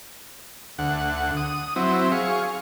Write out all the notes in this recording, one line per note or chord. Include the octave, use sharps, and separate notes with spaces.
D2 F#5
D#6
F#3 C4 E4
G#4 F5 C#6